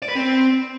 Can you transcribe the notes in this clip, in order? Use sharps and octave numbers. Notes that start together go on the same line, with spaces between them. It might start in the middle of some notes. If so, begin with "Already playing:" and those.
D5
B4
C4